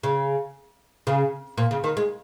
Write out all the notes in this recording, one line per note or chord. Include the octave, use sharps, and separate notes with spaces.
C#3
C#3
A#2
C#3
D#3
G#3